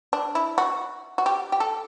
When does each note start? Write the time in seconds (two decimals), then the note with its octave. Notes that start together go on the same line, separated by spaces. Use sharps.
0.13 D4
0.35 E4
0.58 F#4
1.18 F#4
1.26 G4
1.52 G4
1.60 A4